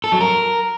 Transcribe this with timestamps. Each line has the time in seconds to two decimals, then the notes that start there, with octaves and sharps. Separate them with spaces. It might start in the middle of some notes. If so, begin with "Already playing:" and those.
0.04 A4
0.12 F#3
0.21 A#4